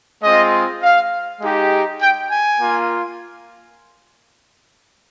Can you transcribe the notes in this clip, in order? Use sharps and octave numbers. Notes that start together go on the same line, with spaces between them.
G#3 C4 F4 D#5
F5
G#3 D#4 G4
G5
G#5
A#3 F4